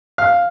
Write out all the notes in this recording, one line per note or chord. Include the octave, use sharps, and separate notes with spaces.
F5